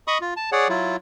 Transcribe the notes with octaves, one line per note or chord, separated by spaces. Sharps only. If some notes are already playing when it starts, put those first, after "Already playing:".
D#5 B5 C#6 D#6
F4
A5
G#4 C#5 D5 F#5
F#3 E4 F4